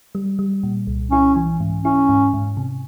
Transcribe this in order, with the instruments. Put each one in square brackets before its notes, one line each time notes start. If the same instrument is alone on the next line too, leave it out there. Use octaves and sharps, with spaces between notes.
[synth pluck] G3
G3
A#2
C2
[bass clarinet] C#4 [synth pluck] E4
[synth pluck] E3
G#2
[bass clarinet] C#4 [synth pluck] E4
[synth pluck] G#2
G#2
C3